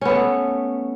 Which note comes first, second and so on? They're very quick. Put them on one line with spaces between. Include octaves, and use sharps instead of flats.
C#4 B3 A3